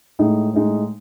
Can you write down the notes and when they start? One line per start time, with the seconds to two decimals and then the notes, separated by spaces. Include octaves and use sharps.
0.19 A2 G#3 D#4
0.54 A2 G#3 D#4